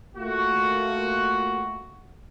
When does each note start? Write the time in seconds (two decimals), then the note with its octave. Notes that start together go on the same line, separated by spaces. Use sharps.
0.16 A3 A#3 F4 F#4